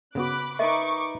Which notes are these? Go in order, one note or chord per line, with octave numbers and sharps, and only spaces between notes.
C#3 B3 F#4 B5 D6 F#6
D#4 A#4 B4 D#5 E5 C#6 D6